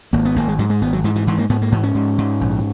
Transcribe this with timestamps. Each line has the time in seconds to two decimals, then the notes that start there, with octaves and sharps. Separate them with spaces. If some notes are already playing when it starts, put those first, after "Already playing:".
0.13 G#1 A#3
0.25 B3
0.36 G#1 A#3
0.48 G#3
0.59 G#2 F#3
0.70 G#3
0.81 G#1 B3
0.93 F#3
1.04 G#2 E3
1.16 E3
1.27 G#2 E3
1.38 A#3
1.49 G#2 B3
1.62 A#3
1.72 G#2 E3
1.83 C#4
1.95 G#2
2.18 G#2
2.41 A#1